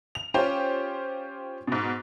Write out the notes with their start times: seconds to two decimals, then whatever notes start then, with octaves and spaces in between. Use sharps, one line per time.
0.15 F7
0.34 C#4 F4 G4 C5
1.68 G#2 B2